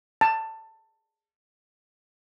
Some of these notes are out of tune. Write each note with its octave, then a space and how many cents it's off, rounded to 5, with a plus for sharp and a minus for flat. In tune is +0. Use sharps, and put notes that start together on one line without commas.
A5 +15